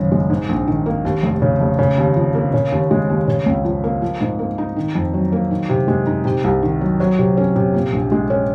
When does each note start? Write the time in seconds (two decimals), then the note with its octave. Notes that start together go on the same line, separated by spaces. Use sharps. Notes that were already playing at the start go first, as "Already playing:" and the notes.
Already playing: G#1 F#2 C#3
0.12 G#3
0.30 G#2
0.49 A#1
0.68 D#3
0.86 A#3
1.05 D#2
1.23 F1
1.42 C#3
1.60 F1
1.79 C#3
1.98 D#2
2.16 F3
2.35 A#3
2.53 C#3
2.72 D#2
2.91 G#3
3.10 D#2
3.28 C#3
3.46 C#2
3.65 F3
3.84 A#3
4.02 F3
4.21 G#2
4.39 A#3
4.58 D#4
4.76 D#3
4.95 F2
5.14 F#3
5.32 A#3
5.51 D#3
5.69 C3
5.88 G#3
6.07 D#4
6.25 C3
6.44 C2
6.62 D#3
6.81 F#3
7.00 F#3
7.19 C3
7.37 C#4
7.56 C3
7.74 A#2
7.93 A#1
8.12 G#3
8.30 C#4